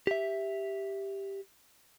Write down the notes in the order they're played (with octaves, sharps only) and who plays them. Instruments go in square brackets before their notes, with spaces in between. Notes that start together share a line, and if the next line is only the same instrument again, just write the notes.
[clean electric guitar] G4 E5